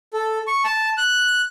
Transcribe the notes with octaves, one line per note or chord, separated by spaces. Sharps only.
A4
C#6
A5
F#6